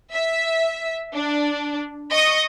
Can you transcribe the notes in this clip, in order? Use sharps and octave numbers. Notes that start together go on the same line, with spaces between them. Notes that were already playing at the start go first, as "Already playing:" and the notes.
E5
D4
D#5 C#6 D#6